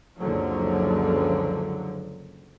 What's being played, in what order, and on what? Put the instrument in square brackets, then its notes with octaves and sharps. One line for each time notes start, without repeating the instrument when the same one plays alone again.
[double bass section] F#1 C#2 D3 F3 F#3